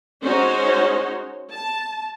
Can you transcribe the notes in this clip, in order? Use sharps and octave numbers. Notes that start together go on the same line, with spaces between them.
G#3 C#4 D#4 F#4 C5 C#5
A5